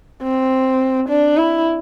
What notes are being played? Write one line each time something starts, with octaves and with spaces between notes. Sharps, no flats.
C4
D4
E4